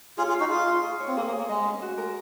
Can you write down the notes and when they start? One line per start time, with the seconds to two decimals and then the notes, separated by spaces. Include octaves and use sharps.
0.18 F4 G#4 C#5
0.29 F4 G#4
0.34 F5
0.40 D#4 F#4
0.50 F4 G#4
0.68 F5
0.83 G#4
1.00 C#5
1.08 C4
1.16 A#3 G#4
1.27 A#3
1.32 G#4
1.38 A#3
1.49 G#3 D#5
1.65 C#4
1.82 F#4
1.98 A#4